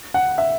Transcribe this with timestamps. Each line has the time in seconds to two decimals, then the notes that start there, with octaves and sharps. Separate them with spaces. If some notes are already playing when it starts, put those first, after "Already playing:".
0.14 F#5
0.38 E5